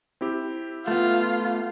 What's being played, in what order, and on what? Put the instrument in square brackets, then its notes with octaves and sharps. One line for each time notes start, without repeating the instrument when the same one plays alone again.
[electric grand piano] C4 E4 G4
[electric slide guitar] A3 B3 [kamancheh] F4